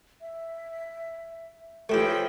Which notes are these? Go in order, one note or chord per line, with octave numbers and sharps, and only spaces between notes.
E5
E3 F3 A3 E4 G4 C#5 G5